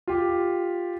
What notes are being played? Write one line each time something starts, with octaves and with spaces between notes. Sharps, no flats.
F4 G4